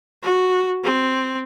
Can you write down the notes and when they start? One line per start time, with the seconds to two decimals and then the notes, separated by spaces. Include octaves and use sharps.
0.23 F#4
0.84 C4